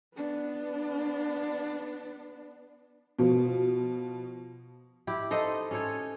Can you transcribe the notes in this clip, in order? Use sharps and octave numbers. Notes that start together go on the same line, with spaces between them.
B3 D4
B2 F3
E4 G4
D#4 A4 C5 D#5
C#4 A4 C#5